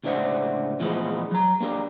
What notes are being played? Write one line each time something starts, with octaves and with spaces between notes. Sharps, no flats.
C#2 A2 D4 C5 E5 F#5
A#2 E3 F3 G#3 A3 B3
F#3 A#5
A#3 D4 G4 A#4